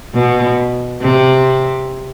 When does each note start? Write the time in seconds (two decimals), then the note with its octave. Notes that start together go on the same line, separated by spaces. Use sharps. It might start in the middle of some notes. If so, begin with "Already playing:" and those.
0.14 B2
1.02 C3